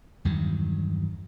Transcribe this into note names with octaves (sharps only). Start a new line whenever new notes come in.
E2 G2 D#3 F#3